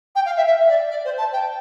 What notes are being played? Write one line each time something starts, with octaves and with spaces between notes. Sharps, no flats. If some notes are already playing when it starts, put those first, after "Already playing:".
G5
F5
E5
E5
D5
D5
C5
A5
G5